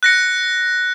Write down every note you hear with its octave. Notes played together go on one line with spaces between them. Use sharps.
F#6 A#6 C#7